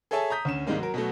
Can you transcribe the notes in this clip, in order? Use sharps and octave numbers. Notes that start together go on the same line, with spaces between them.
G#4 A4 C#5 E5 G#5 A5
A#5 D#6 G6 B6
D2 C#4 E7
G#2 C3 D#3 G3 G#3 A#3
F#3 A#4
B2 F#3 A3